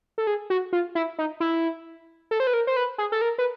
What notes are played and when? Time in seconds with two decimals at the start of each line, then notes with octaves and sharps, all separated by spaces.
0.18 A4
0.27 G#4
0.50 F#4
0.73 F4
0.95 E4
1.18 D#4
1.40 E4
2.31 A4
2.40 C5
2.47 B4
2.54 A#4
2.67 C5
2.77 B4
2.98 G#4
3.12 A4
3.21 A#4
3.38 B4